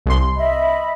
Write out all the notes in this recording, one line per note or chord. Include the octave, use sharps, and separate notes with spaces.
C2 C6
D#5 E5 B5